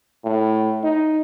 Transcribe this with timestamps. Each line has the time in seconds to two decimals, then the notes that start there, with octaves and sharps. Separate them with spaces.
0.24 A2
0.84 D#4